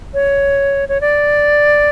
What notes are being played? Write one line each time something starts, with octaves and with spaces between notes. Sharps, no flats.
C#5
C#5
D5